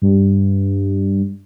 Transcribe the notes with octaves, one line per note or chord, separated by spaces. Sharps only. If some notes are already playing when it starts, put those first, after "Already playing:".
G2